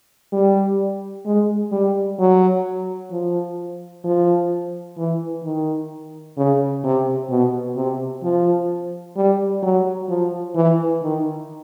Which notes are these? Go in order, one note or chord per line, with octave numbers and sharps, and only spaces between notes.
G3
G#3
G3
F#3
F3
F3
E3
D#3
C#3
C3
B2
C3
F3
G3
F#3
F3
E3
D#3